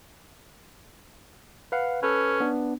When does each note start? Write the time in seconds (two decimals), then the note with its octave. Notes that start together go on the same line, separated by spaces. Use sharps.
1.72 B4 F5 F#5
2.03 C#4 A4 B4
2.40 B3 D4